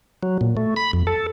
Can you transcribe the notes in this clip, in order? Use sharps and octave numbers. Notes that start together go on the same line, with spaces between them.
F#3
A#2
A3
B5
F2
A4